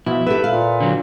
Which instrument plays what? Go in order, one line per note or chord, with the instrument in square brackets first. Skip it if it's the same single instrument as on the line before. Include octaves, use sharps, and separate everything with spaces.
[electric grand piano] B2 E5 [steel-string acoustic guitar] F3 [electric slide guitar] E4
[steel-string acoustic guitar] G4 E5 [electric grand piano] A4 B4
[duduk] A#2 [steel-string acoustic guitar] F5
[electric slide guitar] D3 F#3